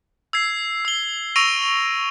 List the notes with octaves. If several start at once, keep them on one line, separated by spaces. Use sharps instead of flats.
E6 G#6 C7
E6 G7
C#6 E6 A#6 D7 D#7 F7